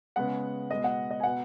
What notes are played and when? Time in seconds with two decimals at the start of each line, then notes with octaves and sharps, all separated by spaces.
0.16 C#3 G#3 B3 F#5
0.71 B2 G#3 B3 D#5
0.84 F#5
1.11 D#5
1.20 G#5
1.23 B2 B3 F#5